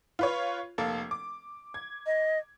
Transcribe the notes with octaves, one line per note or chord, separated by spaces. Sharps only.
F4 B4 C#5
F1 A#3 A4
D6
G#6
D#5